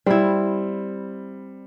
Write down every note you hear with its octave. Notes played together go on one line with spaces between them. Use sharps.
G3 C4 E4